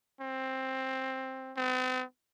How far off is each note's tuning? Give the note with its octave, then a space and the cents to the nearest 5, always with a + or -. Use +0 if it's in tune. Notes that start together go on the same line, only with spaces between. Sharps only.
C4 +10
C4 -45